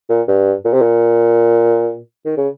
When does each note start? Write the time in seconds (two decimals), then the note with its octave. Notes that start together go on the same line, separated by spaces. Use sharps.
0.09 A#2
0.28 G2
0.65 A#2
0.73 C3
0.81 A#2
2.25 D#3
2.37 C#3